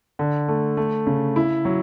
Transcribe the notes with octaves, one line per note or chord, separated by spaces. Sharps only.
D3
A3
A3
C#3
E4
F#3